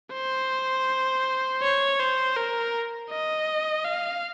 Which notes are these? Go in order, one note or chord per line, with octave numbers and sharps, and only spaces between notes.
C5
C#5
C5
A#4
D#5
F5